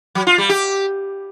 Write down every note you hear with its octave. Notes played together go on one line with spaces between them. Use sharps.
F#3
F4
G3
G4